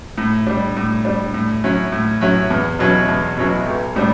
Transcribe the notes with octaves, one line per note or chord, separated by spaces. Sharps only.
A2
G3 D4
A2
G3 D4
A2
F#3 C#4 E4
A2
F#3 C#4 E4
E2
B2 F#3 C#4 E4
E2
B2 F#3 C#4 E4
B1
A2 G3 D4